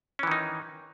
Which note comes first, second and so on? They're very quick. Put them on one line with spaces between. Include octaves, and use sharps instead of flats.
C#4 E3 D#3 D#4